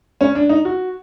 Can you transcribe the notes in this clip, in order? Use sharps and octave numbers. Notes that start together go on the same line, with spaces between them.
C#4
D4
D#4
F#4